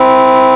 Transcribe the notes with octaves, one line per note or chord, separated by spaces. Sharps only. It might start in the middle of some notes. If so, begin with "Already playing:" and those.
Already playing: C4 E4